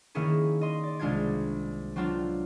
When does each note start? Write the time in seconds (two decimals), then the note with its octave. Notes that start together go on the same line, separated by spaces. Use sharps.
0.15 D#3 A#3 C#4 E4 G#4
0.61 D#5 C6
0.83 D5
0.99 C2 G#3 D4 F4 G#6
1.96 F#3 C4 D4 F4